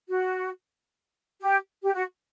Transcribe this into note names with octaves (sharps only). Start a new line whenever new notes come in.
F#4
G4
G4
F#4